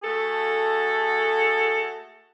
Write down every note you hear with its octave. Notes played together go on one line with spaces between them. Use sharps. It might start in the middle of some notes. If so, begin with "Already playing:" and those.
A3 F#4 G#4 A4